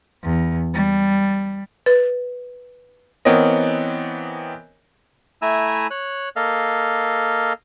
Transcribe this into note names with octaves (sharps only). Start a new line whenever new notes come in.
E2
G3
B4
E3 B3 C4 A#4 C#5 D#5
A3 E4 G#5 A#5 E6
C#5 F#6
A#3 A4 D#5 F5